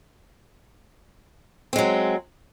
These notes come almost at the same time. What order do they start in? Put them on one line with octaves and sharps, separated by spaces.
C4 G#3 F#3